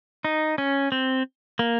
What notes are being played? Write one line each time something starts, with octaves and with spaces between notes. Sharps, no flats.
D#4
C#4
C4
A#3